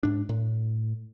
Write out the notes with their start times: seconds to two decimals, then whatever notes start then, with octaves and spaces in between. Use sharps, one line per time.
0.03 G#2 D4
0.29 A2